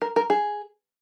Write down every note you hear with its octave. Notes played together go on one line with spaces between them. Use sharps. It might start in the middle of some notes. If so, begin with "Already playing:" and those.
A#4
A#4
G#4